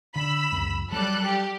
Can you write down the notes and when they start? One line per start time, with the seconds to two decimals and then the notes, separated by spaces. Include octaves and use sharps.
0.16 D3 B5 E6
0.52 C#2 F#2
0.93 F#3 G3 A4 F#6
1.25 G4